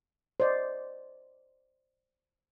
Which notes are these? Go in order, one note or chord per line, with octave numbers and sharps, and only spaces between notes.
C5 D5 D#5